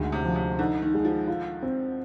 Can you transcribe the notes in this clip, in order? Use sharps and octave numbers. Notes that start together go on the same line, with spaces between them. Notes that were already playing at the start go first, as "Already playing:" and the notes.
Already playing: D2 G#2 G#3
C3
F3
C3
D3 D#4
D#3
G#3
F3
F4
C4